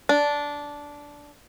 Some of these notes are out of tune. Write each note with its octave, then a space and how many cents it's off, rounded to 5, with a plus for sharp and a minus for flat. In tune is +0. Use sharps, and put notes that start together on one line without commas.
D4 -10